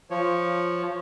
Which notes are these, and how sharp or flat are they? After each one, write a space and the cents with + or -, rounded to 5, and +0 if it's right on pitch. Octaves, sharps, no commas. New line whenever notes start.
F3 +0 C#5 +0